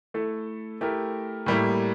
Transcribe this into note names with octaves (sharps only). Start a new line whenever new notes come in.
A3 E4 A4
A3 E4 G4 A#4
A2 G3 A#3 E4